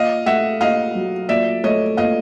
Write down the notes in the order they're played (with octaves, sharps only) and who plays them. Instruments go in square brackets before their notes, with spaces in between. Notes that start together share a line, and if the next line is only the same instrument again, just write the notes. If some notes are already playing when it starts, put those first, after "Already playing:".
Already playing: [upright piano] A#2 [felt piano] D#5 F5
[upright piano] A3 [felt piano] E5 F#5
[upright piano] A#2 [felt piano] D#5 F5
[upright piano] F#3
[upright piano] A#2 [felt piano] D5 E5
[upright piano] A3 [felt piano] C#5 D#5
[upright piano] A#2 [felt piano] D#5 F5